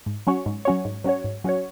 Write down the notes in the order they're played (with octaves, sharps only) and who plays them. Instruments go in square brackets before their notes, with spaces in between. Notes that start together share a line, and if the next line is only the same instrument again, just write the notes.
[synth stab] G#2
F#3 C#4 F#4 C#5
G#2
F#3 C#4 F#4 C#5
G#2
F#3 C#4 F#4 C#5
G#2
F#3 C#4 F#4 C#5